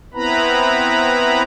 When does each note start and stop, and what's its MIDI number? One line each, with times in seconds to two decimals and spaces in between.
0.14 1.43 59
0.14 1.43 60
0.14 1.43 64
0.14 1.43 71
0.14 1.43 82
0.14 1.43 83